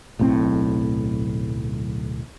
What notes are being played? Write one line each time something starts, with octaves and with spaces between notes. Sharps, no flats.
D1 B1 A2 C4